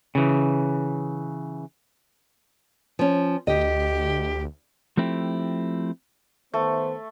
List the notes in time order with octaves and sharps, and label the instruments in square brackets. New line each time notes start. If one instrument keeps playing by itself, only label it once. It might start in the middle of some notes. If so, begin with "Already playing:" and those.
[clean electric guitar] C#3 E3
[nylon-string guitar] F3 C#4
[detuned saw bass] D2 [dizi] G4 [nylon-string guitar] D#5
[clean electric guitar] F3 A3 C4 E4 G4
[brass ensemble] D#3 B3 C5 [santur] A3